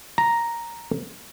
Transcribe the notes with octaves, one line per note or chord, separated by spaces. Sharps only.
A#5